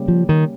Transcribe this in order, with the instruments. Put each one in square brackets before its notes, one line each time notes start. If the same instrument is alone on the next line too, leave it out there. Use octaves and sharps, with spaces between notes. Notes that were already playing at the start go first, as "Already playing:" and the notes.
Already playing: [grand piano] C#3 G3 A#3 C#4
[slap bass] F3
D#3